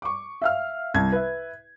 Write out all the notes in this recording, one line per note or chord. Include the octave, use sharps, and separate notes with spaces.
C#6 D6
E5 F5 F6
C2 G#6
B4 E5